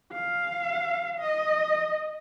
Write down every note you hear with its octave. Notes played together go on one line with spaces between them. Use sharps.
F5
D#5